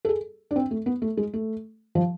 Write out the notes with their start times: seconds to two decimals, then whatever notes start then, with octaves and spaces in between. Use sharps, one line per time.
0.05 A4
0.09 G#4
0.51 D4
0.56 C4
0.71 A3
0.86 B3
1.02 A3
1.17 G#3
1.34 A3
1.95 F3